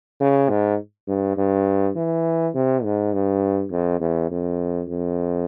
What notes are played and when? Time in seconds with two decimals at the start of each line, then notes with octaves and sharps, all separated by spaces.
0.20 C#3
0.49 G#2
1.08 G2
1.37 G2
1.96 E3
2.55 C3
2.84 G#2
3.13 G2
3.71 F2
4.01 E2
4.31 F2
4.89 F2